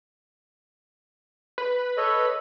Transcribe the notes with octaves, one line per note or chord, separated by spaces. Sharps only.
B4
A4 C#5 D#5